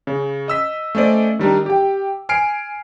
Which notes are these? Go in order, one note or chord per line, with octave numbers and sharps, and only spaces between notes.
C#3
D#5 E6 B6
A3 C#4 C5 D5 D#5
D#3 G3 D4 D#4
G4 G5
G#5 F6 C7 D7